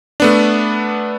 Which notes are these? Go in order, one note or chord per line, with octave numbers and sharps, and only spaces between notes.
A3 B3 D4